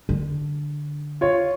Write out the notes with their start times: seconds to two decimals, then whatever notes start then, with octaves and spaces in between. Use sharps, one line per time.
0.09 D3
1.21 F4 C#5